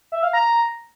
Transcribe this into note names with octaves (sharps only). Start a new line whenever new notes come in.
E5
F5
A#5